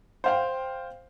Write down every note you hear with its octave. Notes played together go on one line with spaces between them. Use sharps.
C5 F5 G5